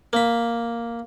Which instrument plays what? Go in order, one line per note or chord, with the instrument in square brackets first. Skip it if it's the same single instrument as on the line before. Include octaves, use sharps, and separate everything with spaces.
[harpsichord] A#3 B5